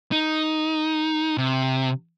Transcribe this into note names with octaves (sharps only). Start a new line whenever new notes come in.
D#4
C3